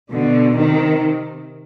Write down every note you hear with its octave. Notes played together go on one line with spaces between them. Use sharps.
B2 D3
C3 D#3